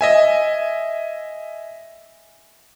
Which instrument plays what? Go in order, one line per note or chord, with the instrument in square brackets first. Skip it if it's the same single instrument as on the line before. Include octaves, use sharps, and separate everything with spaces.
[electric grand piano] D#5 E5 G#5